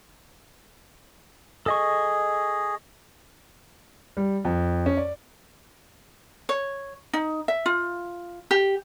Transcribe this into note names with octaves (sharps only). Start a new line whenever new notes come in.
G#4 A4 D#5 C#6
G3
F2
C#4
D5
C#5
D#4
E5
F4
G4